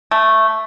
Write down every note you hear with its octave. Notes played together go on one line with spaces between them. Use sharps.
A3